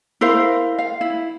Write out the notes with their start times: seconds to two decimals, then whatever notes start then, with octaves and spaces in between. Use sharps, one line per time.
0.21 E4 A#4 C5 F5
0.79 F5
1.01 E4